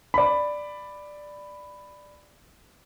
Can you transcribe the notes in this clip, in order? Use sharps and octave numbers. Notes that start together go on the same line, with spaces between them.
D5 B5